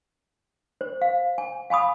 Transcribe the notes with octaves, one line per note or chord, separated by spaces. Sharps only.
C5
F5
G#5
F5 G#5 B5 D#6